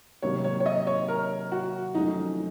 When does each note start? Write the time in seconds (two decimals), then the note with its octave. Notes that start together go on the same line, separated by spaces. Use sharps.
0.22 C3 D#3 F#3 A#3 C#5
0.44 C#5
0.60 C#5
0.66 D#5
0.87 C#5
1.08 A#4
1.52 F#4
1.95 F2 D#3 F#3 A3 C#4 D#4